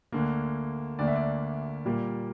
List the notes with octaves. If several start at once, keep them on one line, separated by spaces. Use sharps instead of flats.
D2 D3 A#3
D2 D3 A#3 D5
E5
D5
A#2 G3 A#3